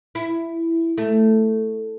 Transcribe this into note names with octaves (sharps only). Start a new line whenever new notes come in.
E4
A3